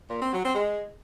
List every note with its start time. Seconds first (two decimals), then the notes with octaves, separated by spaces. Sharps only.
0.09 A#2
0.20 C4
0.32 F#3
0.44 C4
0.55 G#3